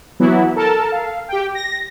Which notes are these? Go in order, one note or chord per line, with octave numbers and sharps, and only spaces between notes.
E3 F#3 B3 E4
A4 A#4 A5
F5
G4 G5
A#6